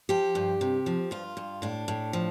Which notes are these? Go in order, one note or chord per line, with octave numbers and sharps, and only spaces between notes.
F3 G4
G2
C3
F3
G2 F4
G2
A2 D4
A2
F3